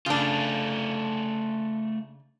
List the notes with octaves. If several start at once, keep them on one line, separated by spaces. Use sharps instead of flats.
C#3 A3 D4 F4